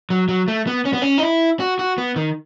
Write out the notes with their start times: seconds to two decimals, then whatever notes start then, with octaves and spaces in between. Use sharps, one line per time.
0.10 F#3
0.29 F#3
0.48 A3
0.67 B3
0.85 C#4
0.93 B3
1.02 C#4
1.18 D#4
1.23 E4
1.60 F#4
1.79 F#4
1.98 B3
2.16 D#3